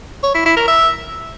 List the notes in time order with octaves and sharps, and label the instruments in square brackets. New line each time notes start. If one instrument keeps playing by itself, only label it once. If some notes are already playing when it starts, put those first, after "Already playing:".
[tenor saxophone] C#5
E4
E4
A#4
E5